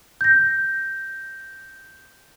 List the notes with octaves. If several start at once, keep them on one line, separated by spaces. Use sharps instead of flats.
G6 A#6